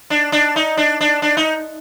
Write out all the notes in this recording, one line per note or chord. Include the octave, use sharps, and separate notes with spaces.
D4
D4
D#4
D4
D4
D4
D#4